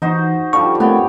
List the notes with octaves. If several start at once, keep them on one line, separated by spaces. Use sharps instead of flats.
E3 D#4 F#4 C5
D3 F3 G3 C#6
A3 B3 C4 G4 A#4 C#5